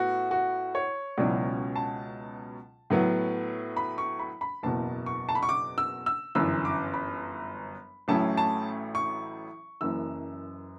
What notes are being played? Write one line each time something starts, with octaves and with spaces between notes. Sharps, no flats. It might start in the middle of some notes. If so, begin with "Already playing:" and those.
Already playing: A2 B3 F#4
F#4
C#5
C#2 B2 F#3 C#4 E4 D5
A5
A2 F#3 B3
B5
C#6
B5
B5
F#1 E2 B2 A5
C#6
A5
B5
C#6
D6
E6
E6
G1 F#2 E3 E6
D6
B5
A1 A2 F#3 C#4 E4 A5
A5
C#6
F#1 F#2 E3 E6